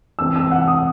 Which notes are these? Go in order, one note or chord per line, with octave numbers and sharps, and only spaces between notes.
E3 C4 E6
E6
F#5
D#6